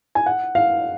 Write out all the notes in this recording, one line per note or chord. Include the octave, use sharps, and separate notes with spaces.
G#5
F#5
F5